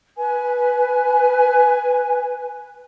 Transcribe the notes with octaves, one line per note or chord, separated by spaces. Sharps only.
B4 G#5